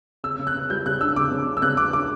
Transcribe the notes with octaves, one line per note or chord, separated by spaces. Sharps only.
C#3 E6
C#3
F#6
C#3
G3 G6
C#3 F#6
D4 E6
C#3 D6
C#3
D4
E6
C#3 F#6
C#3 D6
D4 D6